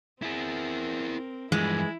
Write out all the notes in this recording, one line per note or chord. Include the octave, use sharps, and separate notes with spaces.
C4 E4 G#4 A#4
G2 E3 F3 G#3 E4